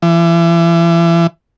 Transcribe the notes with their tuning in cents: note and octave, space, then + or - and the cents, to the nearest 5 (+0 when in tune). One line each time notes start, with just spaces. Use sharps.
E3 +35